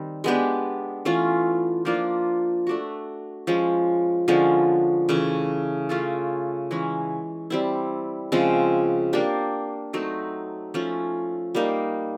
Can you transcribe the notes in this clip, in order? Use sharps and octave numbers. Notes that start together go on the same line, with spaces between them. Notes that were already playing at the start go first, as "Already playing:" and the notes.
Already playing: D#3 G3 C4
G#3 B3 D4 G4
E3 A3 C#4 F4
F3 A#3 D4 F4
A3 D4 F#4
F3 G#3 C#4
D3 F3 G#3 C#4
C#3 E3 A3 C#4
A3 C#4 F4 A4
E3 G#3 C#4
G3 C4 E4
C#3 F3 G#3 C4
A#3 D4 G4
F#3 A3 C4 D#4
F3 A3 C#4
G3 A#3 D#4